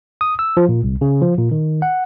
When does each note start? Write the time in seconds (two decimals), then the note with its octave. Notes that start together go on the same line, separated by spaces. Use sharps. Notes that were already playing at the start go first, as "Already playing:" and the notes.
0.21 D#6
0.39 E6
0.57 F3
0.69 A#2
0.83 C2
1.01 C#3
1.21 F3
1.38 A#2
1.51 D#3
1.82 F#5